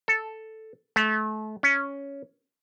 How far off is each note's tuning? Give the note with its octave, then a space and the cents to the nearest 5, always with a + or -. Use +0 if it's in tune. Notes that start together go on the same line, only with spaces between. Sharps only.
A4 +0
A3 -30
C#4 +5